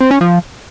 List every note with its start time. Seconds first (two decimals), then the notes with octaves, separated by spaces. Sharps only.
0.01 C4
0.11 C#4
0.21 F3